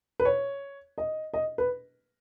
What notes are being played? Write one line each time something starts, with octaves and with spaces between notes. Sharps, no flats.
B4
C#5
D#5
D#5
B4